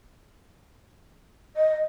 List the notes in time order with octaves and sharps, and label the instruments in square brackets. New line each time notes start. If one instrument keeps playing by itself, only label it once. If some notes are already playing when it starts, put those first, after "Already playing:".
[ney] D#5